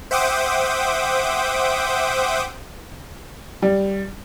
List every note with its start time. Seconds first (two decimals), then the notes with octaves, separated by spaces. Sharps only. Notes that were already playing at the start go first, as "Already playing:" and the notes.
0.11 C5 E5 F#5 G5 D6 D#6
3.62 G3